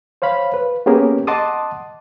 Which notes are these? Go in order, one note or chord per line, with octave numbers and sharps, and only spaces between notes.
C5 C#5 F5 B5
B4
A#3 B3 C#4 G4 G#4 A#4
D#5 F#5 A5 C6 D6 D#6